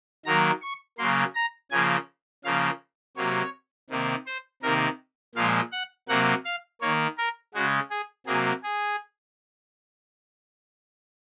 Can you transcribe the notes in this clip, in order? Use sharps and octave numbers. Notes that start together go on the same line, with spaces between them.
D#3 F#3 A#3 A#5
C#6
C#3 F#3 A#3 C6
A#5
C#3 F3 A#3 G#5
C#3 F3 A#3 F5
C3 F#3 A#3 C#5
C3 D#3 A#3
C5
C3 D#3 A#3 A#4
A#2 F3 G#3 F5
F#5
C3 F#3 A#3 F#5
F5
D#3 A#3 C#5
A#4
C#3 G#3 F#4
G#4
C3 F#3 A#3 G#4
G#4